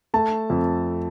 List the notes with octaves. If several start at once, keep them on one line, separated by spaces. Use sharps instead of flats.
A3 A5
F2